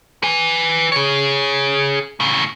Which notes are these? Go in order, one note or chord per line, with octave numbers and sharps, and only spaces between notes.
B4 G#5
G#4 C#5
A2 C#3